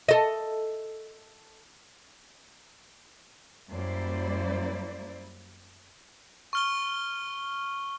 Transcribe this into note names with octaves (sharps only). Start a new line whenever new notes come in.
A4 D#5
F#2 G3 A#3 E4 C5 D5
C#6 F6 G7